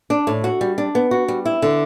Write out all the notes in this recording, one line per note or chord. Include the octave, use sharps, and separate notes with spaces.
D4
A2
F#4
G3
D4
B3
F#4
G3
E4
D3